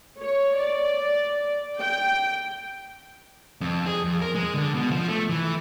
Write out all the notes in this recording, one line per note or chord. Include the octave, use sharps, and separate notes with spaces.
C#5
D5
G5
F2
G#4
F2
A#4
G#3
D3
B2
F3
A3
E3